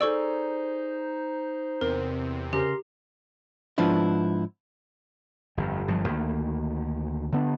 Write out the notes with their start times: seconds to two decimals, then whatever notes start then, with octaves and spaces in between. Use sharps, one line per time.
0.01 D#4 G#4 A4 C5 D5 C#6 E6
1.81 E2 C3 A#4
2.53 C#3 G4 A#4 A#5 C6
3.78 G#2 F3 B3 D4 E4
5.57 G1 F2
5.88 G1 G2 F3 F#3
6.08 D2 D#3 A#3
7.32 D3 B3 D4